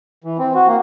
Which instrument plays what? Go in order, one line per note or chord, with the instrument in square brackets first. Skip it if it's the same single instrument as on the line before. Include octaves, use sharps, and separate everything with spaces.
[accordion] E3
C4
F#4
A#3